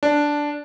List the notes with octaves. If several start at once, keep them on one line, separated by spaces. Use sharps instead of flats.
D4